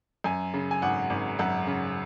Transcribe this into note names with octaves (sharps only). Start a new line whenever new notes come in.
F#2 G#5
C#3
G#5
G#1 F#5
G#1
F#2 F#5
C#3